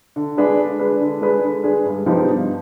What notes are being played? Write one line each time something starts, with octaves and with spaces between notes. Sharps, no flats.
D3
G#3 D4 G#4 B4
D3
G#3 D4 G#4 B4
D3
G#3 D4 G#4 B4
D3
G#3 D4 G#4 B4
G2
F3 B3 D#4 G4
G2